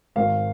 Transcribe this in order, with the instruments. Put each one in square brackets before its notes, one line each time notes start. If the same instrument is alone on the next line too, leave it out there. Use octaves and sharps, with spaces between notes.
[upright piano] G#1 G#2 D#3 F5